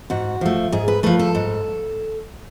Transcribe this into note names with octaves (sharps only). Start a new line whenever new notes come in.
G#2 F#4
F3 A3
G#2 G#4
B4
F3 A3 B4
A4
G#2